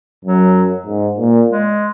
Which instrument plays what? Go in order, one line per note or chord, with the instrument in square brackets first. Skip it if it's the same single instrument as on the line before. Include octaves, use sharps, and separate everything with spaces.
[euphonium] F#2 [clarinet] F#3
[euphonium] G#2
A#2
[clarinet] G#3